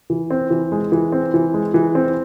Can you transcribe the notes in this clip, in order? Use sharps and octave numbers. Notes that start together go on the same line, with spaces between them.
E3
C4
E3
G#3
E3
C4
E3
G#3
E3
C4